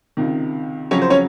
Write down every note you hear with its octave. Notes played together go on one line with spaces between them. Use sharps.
C#2 C3 D#3
F2 C#3 F#3 C#4 C#5
C5
C#4 C#5